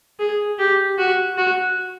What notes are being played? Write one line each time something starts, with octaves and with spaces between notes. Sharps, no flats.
G#4
G4
F#4
F#4